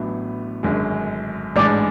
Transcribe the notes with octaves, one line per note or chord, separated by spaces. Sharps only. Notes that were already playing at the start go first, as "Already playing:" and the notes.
Already playing: A1 A2 F#3 B3 D4
G#1 F#2 D3 G#3
A1 G#2 G#3 D4 D5